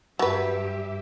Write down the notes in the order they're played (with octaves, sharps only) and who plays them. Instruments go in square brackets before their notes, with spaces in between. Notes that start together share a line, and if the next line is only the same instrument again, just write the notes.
[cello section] G2 G4 E5 [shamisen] F#3 B4